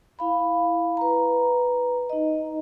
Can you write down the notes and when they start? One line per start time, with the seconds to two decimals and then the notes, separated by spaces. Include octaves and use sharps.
0.19 E4 F5 B5
0.97 B4 A#5
2.10 D#4 D#5